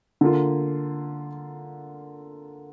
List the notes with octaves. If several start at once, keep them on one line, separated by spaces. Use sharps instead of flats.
D3 A#3 F4